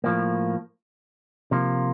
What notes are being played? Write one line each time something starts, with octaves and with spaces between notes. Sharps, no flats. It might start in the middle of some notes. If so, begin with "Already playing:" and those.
A2 F3 A#3
C3 F3 A#3